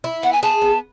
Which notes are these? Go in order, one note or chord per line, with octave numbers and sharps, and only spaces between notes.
E4
B3 F#5
G#5
G#4 A5
B3